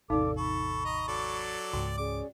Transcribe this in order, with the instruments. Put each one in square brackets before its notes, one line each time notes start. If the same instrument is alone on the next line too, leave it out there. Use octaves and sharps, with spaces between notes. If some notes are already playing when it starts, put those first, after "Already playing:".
[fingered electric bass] A1 E2 C3 [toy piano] D#4 F5 [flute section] A4 D5 D6
[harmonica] A4 [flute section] B5 C#6
[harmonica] D#5 A#5
F#3 A4 D5
[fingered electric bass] C#2 G#2 [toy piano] F#4 G5
[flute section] C#4 G#4 D5 [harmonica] D6